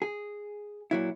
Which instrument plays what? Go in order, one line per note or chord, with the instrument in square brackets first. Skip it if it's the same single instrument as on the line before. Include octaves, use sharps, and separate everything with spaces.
[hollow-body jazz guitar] G#4
A#2 F#3 E4